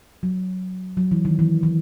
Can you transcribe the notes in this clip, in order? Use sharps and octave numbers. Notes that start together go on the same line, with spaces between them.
F#3
F#3
E3
D#3
E3
E3